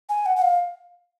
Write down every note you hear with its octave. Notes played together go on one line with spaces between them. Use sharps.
G#5
F#5
F#5
F5